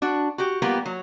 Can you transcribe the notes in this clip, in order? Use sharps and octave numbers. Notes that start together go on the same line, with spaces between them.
D4 F#4
F#4 G4
G3 A#3 B3 F4 G4
F#3